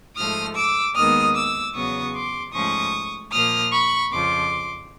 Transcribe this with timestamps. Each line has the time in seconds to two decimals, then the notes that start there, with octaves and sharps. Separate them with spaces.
0.16 G#2 F3 A3 D#6 F6
0.56 D6 E6
0.95 D#2 D#3 G#3 B3 D#6 F6
1.35 D6 E6
1.74 E2 C#3 F#3 B3 C#6 D#6
2.14 C6 D6
2.53 G#2 F3 A3 C#4 C#6 D#6
3.32 A#2 F3 A#3 D#6 F6
3.72 B5 C#6
4.11 F2 C#3 F3 C6 D6